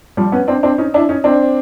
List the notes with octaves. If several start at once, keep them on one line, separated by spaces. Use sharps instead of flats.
F3 G3
B3 C#4
C4 D4
C4 D4
C#4 D#4
D4 E4
C#4 D#4
C4 D4